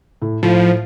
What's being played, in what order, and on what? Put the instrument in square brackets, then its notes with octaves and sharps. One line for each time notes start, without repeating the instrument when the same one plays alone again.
[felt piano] A2
[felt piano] A2 [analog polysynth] F3